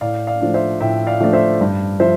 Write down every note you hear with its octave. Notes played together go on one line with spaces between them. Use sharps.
A2 D5 F5
D5 F5
F3 A3 D4
C5 E5
A2 E5 G5
D5 F5
F3 A3 D4 D5
C5 E5
G2
F3 C5 E5